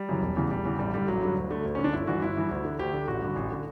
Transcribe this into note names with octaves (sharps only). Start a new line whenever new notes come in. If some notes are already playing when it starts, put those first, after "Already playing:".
Already playing: G3
F#2 C#3 E3
E1
E2 C#3 E3
E1 G3
E2 C#3 E3
A1 G3
G2 D3 G3
A1 F#3
G2 D3
D2
D3 A3
D2
C#4
D3
D4
G1 E4
G2 E3 F#4
G1 E4
G2 E3
D2
D3
D2 G4
D3
A1 F#4
G2 D3
A1
D3